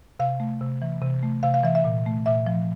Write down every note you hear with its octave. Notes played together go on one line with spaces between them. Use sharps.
C3 F5
A3
C3
E3
C3
A3
C3 F5
F5
E3 E5
E5
A#2
A3
A#2 E5
F3